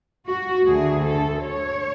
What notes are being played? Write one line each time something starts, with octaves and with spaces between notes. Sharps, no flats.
F#4
D2 D3 A3 G#4
A4
C#5